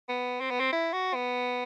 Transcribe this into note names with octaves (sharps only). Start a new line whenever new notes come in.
B3
C4
B3
C4
E4
F#4
B3